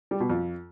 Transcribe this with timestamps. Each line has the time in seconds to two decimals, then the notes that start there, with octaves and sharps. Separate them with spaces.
0.11 G3
0.20 B2
0.30 F2